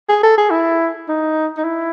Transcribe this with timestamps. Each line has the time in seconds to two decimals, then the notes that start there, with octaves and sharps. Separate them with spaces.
0.09 G#4
0.23 A4
0.38 G#4
0.51 E4
1.08 D#4
1.57 D#4
1.64 E4